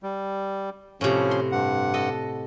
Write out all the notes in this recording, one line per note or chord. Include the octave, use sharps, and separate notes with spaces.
G3
A2 C3 F3 C#4
C6
G2 F#5
A4 D#5